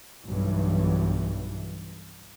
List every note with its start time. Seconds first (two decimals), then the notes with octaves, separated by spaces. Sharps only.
0.25 B1 G2 E3